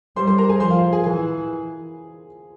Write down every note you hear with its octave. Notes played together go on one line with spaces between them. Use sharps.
G3 C5 C6
C5 C6
A#4 A#5
G#4 G#5
F3 C5 C6
F4 F5
G#4 G#5
E3 G#4 G#5